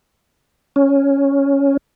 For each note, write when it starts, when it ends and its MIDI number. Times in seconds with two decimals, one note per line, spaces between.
0.76 1.77 61